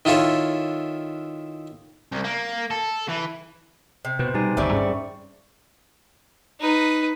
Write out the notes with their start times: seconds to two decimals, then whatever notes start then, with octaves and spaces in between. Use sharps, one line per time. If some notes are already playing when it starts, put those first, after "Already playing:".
0.05 D#3 E4 F4 A4 C#5
2.12 C2
2.24 A#3
2.71 A4
3.08 E3
4.05 C3
4.19 B2 B4 C5
4.34 B2 G3 D#4 G4 G#5
4.57 G1 D#2 C#3 C4 D5 E5 B5 C#6
4.73 G2 C#4 G#4 C#6
6.60 D#4 B4